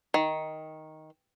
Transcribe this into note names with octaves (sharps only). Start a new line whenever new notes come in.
D#3